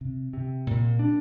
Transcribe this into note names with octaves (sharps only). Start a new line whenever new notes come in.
C3
C3
A#2
D4